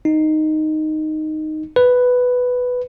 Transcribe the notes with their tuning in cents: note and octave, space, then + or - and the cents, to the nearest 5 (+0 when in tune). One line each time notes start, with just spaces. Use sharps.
D#4 -5
B4 +5